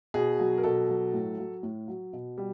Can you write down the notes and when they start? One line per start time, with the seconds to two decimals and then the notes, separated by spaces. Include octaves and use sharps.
0.14 B2 G#4
0.39 F#3
0.58 A#4
0.63 B2 A4
0.89 F#3
1.13 A2
1.38 F#3
1.63 A2
1.88 F#3
2.13 B2
2.38 G3